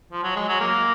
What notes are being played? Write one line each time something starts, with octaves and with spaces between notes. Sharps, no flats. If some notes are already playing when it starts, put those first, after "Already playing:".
F3
F#3
G#3
F#3
A#3